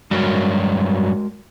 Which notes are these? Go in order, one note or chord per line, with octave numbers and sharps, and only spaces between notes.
G2 F#3 G#3 F#4 A#4